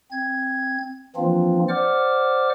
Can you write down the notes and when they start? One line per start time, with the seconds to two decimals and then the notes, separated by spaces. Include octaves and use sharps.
0.12 C4 G#6
1.16 E3 F3 A#3 C4 D4 F4
1.69 C5 D5 F#5 D6 F6